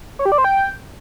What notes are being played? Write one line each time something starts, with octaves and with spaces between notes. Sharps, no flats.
C#5
G4
D5
C5
G5